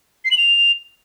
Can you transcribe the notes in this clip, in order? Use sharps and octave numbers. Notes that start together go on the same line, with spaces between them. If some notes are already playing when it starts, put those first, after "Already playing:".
C7
F#7
F7